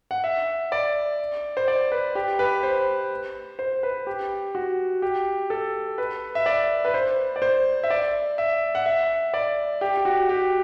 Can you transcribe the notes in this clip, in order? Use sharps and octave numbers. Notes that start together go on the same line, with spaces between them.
F#5
E5
D5
C5
D5
B4
G4
B4
C5
C5
B4
G4
F#4
G4
A4
B4
E5
D5
B4
C5
D5
C5
E5
D5
E5
F#5
E5
D5
G4
G4
F#4
G4